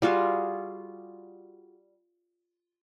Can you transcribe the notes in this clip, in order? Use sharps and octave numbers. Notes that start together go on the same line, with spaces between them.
G3 F4 F#4 G#4